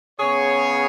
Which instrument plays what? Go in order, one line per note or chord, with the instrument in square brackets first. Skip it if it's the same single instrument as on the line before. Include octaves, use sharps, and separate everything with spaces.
[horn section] C#3 B3 G#4 C#5